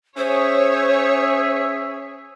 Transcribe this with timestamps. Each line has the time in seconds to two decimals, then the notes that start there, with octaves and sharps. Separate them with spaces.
0.17 C#4 G#4 C5 C#5 E5